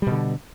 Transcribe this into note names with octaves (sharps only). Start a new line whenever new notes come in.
B2 D3 G3